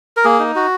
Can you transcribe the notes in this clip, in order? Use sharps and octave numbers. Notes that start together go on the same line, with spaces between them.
A#4
A#3 G#4
D#4
F#4